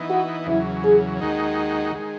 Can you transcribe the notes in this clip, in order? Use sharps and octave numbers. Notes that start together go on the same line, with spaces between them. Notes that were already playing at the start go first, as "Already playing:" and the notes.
Already playing: E3 B3 D#4
F#4
E2 C#3 F#3 E4
G#4
D#2 D#3 G#3 D#4 F#4
D#3 G#3